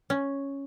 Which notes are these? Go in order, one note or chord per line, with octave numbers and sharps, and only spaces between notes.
C#4